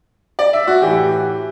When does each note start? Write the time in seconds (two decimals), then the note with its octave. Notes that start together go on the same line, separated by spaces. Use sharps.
0.39 D5
0.53 E5
0.67 F#4
0.82 A2 E3 G4